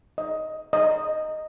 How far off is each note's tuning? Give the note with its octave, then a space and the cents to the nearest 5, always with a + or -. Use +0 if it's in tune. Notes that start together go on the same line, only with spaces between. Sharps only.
D#5 +10
D#5 -5